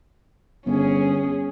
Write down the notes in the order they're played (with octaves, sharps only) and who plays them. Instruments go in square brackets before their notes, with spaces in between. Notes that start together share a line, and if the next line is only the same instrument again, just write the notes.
[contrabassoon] G1 [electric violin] C#4 G#4